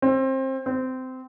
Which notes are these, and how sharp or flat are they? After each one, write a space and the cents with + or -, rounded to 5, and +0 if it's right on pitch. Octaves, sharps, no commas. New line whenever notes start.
C4 +25
C4 -20